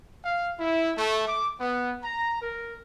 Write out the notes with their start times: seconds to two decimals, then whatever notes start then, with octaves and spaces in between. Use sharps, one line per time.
0.24 F5
0.59 E4
0.97 A3
1.27 D6
1.60 B3
2.04 A#5
2.41 A#4